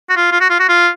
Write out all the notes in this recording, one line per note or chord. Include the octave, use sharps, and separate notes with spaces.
F#4
F4
F4
F#4
F4
F#4
F4